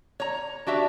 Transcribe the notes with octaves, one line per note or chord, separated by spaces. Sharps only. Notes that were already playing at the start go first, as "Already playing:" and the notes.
C#5 A#5
D4 F#4 G4 E5